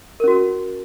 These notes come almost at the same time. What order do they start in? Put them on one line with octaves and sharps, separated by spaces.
A#4 C#4 F#4